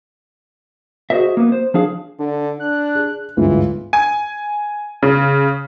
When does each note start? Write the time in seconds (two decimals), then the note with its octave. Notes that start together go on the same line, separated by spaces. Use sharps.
1.10 F#4 G#4 A4 C5 D#5 E5
1.37 A#3 B3
1.52 C5
1.74 F3 D4 G#4 F5
2.19 D3 D4
2.60 D4 F#6
2.95 G#4
3.37 G1 D2 G#2 E3 F4
3.93 G#5
5.03 C#3